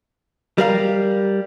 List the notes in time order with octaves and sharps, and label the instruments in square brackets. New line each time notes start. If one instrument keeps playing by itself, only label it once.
[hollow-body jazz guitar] G3 A#4 F5